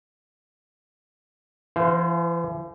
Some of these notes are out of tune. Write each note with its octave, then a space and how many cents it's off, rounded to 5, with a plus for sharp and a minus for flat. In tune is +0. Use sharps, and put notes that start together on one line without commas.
E3 +45 C5 +0 F5 +40